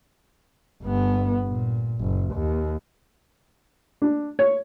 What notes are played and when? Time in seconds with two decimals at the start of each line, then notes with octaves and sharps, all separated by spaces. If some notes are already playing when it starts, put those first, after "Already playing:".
0.83 G1 B3
1.47 A#2
1.99 F#1
2.34 D#2
4.02 D4
4.39 C#5